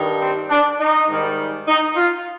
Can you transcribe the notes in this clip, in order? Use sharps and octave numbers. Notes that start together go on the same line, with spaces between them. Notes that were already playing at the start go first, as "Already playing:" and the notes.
Already playing: G2 D#3 G3
C4
D4
D#4
G#2 D#3 G3
D#4
F4